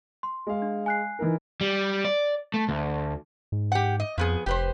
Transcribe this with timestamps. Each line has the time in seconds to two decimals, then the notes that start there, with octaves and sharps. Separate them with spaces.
0.23 C6
0.47 G#3 F5
0.62 D4
0.86 G#5 F#6 C7
1.19 E3 D#4 A#4
1.61 G3
2.05 D5
2.54 A3
2.69 D2
3.52 G#2
3.72 G4 F#5
4.00 D#5
4.18 F2 F3 B3 G#4
4.46 F1 G4 B4 C5